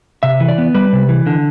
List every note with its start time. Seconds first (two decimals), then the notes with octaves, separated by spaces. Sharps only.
0.23 C3 E5
0.40 E3
0.48 D5
0.58 B3
0.74 G3 B4
0.93 C3
1.09 E3
1.26 D3